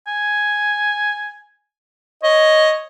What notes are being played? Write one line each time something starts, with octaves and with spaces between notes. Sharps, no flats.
G#5
C#5 D#5